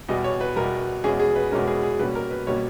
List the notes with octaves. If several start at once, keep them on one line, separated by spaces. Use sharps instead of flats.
E2 B2 G3 D#5
C#5
B4
E2 B2 G3 A#4
E2 B2 G#3 C#4 G#4
G#4
B4
E2 B2 G#3 C#4 A#4
G#4
G#4
B2 G3 A#3 C#4 B4
A#4
B4
B2 G3 A#3 C#4 C#5